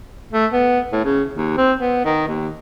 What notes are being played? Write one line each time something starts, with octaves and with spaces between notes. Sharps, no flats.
A3
B3
A2
C#3
D#2
C4
B3
D#3
D#2